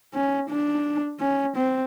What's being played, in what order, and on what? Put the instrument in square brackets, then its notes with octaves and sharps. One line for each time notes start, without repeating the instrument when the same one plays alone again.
[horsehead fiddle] C#4
D4
C#4
C4